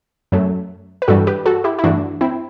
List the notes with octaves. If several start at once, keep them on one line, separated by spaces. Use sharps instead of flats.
F#2 F#3 A3
B4
G2 E3 G3 F#4 A4
G4 B4
F#4 A4
E4 G4
E4
G2 E3 A3 D4 F#4
C4 E4